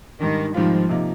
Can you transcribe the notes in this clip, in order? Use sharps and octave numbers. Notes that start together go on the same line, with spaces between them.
G#2 D#3 G3 D4
G#2 D#3 F3 G3 C4 F4
C3 F3 A#3 D#4